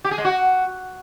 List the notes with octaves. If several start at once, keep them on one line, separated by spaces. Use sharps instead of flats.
G4
G#4
G#3
F#4